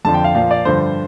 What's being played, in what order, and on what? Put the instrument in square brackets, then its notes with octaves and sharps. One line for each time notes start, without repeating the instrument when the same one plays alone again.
[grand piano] F2 D3 F3 A5
G5
F5
A#2 F3 F5
D5
G2 D3 F3 C5